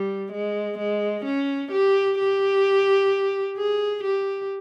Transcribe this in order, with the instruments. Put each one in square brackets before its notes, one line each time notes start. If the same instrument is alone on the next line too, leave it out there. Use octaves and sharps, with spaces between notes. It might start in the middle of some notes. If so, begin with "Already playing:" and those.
Already playing: [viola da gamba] G3
G#3
G#3
C#4
G4
G4
G#4
G4